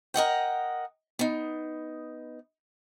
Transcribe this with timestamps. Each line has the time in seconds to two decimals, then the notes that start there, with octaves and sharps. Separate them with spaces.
0.14 A#4 D#5 F#5 G5
1.19 B3 D#4